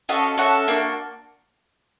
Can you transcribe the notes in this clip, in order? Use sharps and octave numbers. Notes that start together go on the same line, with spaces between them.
C#4 F#4 A4 D#5 F5
C#4 F#4 A4 E5 F#5
A#3 D4 F#4